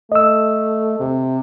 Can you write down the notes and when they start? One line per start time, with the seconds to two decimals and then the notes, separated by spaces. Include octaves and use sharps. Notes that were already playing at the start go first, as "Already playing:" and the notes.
0.12 A3 D#5 E6
1.00 C3